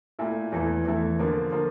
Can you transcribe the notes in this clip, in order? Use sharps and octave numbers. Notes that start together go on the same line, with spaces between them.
A#2 A3 E4
E2 E3 A3 E4
E2 E3 A3 E4
D3 F3 A#3
D3 F3 A#3